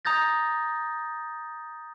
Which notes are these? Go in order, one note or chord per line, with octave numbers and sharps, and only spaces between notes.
A#5 D#6 G6 A6 A#6